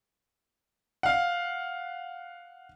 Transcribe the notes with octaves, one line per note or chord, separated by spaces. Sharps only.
F5 F#5